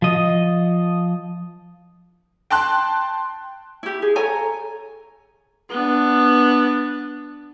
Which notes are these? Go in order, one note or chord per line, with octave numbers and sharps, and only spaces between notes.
F3 D#5
G5 A5 C6 F#6
E4 G4
G#4
A4 C#5 G#5 A#5
B3 D4